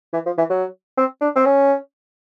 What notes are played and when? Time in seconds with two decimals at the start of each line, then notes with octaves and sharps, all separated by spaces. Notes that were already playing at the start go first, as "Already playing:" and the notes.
0.13 E3
0.26 F3
0.38 E3
0.50 F#3
0.97 C4
1.21 D4
1.36 C4
1.45 C#4